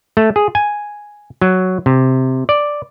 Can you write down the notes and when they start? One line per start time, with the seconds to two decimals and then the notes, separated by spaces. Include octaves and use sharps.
0.17 A3
0.36 G#4
0.55 G#5
1.42 F#3
1.86 C3
2.49 D5